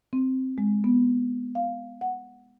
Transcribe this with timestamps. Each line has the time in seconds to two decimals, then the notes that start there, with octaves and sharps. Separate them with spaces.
0.13 C4
0.58 G#3
0.84 B3
1.55 F5
2.01 F#5